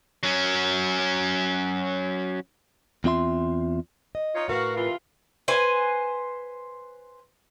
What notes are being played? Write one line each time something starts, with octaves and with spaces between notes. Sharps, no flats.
F#3 C#4
E2 C4 F4 E5 C6
D#5
D#4 F4 C#5
A2 F#4 A#4 B4 F5
C3 E3 F4
B4 C5 G#5